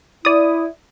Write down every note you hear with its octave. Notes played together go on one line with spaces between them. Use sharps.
E4 D5 D#6